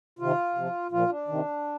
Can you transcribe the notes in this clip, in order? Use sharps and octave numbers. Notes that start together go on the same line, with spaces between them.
C3 D#3 F4
C3 F3
A#2 F3 F4
D4
C3 D#3